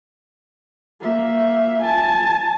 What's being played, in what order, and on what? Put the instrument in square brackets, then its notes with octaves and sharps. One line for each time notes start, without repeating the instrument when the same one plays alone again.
[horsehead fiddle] A#3 E5
G#5 A5